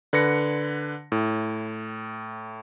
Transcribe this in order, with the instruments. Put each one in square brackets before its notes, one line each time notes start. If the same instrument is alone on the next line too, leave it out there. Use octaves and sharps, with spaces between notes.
[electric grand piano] D3 B4 A#6 C#7
A2